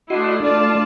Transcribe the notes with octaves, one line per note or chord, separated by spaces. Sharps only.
A3 D4 E4 F#4 D#5 C6
A3 D4 F4 D5 A5